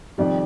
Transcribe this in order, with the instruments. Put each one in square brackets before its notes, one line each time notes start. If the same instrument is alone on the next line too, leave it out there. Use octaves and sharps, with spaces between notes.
[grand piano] F2 C3 D#3 G3 D5